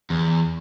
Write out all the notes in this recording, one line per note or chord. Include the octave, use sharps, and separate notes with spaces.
E2